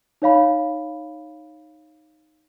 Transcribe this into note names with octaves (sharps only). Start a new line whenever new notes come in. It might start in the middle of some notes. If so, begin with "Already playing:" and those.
D#4 C#5 F5 B5